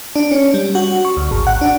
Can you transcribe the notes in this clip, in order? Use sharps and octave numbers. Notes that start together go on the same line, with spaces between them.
D4
C#4
G3
F#4
C#6
D2
G#1
F#5
D4